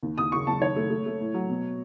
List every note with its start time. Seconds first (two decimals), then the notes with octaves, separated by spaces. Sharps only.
0.03 D#2
0.18 D#2 D#6
0.32 F#1 C#6
0.47 F#1 A5
0.62 D#3 C#5
0.76 A3
0.90 A3
1.06 A3
1.21 A2
1.34 F#3
1.50 B2